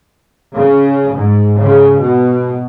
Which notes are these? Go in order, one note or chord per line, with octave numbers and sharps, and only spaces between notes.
C#3
G#2
C#3
B2